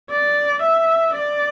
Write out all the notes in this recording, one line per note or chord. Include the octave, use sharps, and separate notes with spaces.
D5
E5
D5